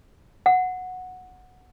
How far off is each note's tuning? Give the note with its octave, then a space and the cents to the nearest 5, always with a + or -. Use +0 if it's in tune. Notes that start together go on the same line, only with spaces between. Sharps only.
F#5 -10